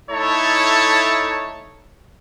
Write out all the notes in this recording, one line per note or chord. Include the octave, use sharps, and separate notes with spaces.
A3 D#4 E4 A4 C#5 A5